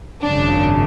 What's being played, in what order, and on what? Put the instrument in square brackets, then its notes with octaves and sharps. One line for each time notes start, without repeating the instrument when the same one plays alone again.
[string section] G#1 F#2 C#3 D4